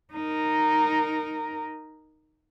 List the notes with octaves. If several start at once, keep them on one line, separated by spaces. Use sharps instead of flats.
D#4 A#4